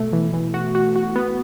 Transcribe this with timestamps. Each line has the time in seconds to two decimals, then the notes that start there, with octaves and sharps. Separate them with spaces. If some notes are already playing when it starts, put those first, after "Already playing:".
Already playing: B2 A3
0.13 E3
0.33 E3
0.54 F#4
0.75 F#4
0.96 F#4
1.16 B3